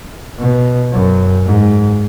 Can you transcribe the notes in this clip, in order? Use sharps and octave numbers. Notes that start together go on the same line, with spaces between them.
B2
F#2
G#2